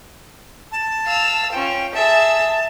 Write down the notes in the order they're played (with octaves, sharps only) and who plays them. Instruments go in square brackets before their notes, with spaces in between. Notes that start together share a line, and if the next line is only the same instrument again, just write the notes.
[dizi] A5
[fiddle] F5 E6
[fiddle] C#4 F4 [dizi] G5
[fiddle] G#4 E5 [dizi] A5